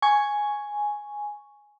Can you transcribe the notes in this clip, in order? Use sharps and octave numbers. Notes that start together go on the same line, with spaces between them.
G#5 C#6